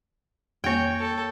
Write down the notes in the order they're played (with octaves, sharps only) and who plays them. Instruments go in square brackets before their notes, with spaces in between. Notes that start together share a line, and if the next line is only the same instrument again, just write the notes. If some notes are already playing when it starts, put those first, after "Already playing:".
[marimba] F2 A#3 [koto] C#5 G5
[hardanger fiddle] A4